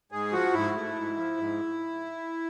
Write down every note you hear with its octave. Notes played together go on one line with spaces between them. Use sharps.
G#2 G#4
F3 F#4
G#2 E4
A3
G#2
F3
G#2